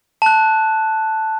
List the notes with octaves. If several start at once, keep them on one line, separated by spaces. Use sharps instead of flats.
A5 F#6